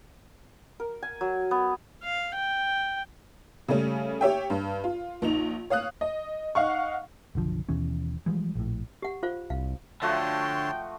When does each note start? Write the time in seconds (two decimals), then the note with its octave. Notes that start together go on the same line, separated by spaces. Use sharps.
0.80 A#4
1.03 G#5
1.21 F#3
1.51 B3
2.03 F5
2.35 G5
3.68 C#3 G3 A3 C#4
4.21 G4 C#5 E5 G5
4.50 G2
4.84 F4
5.22 A#1 D#4 F7
5.70 C#5 F5 D#6 F#6
6.01 D#5
6.55 D#4 F5 F#5 C#6
7.35 F#1 B1 D3 F3
7.69 D#2 B2 E3 C#4
8.26 E3 F3 G3 G#3
8.55 A#1 A2
9.02 G4 F#5
9.23 F4 C5 F5
9.50 C2 F5
10.02 D3 F3 A3 F#4 C#5 G5 A5 C6